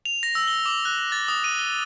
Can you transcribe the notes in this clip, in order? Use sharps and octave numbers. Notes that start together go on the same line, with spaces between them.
F7
A#6
E6
G7
D6
F#6
A6
D#6
D#7
G7